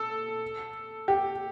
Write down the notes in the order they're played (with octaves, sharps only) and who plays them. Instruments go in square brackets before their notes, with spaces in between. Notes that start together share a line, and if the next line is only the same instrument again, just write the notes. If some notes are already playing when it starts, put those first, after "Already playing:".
Already playing: [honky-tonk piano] A4
G4